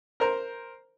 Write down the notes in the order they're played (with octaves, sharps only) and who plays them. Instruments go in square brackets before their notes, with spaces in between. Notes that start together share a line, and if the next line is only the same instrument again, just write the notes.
[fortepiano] A#4 C5 A#5